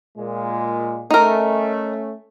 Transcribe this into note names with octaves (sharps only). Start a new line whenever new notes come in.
A#2 G#3
A3 C#4 D#4 A#4